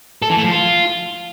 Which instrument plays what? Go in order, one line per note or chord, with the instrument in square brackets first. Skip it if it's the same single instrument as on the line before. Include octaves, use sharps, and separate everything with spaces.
[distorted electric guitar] A4
E3
A3
F3
F4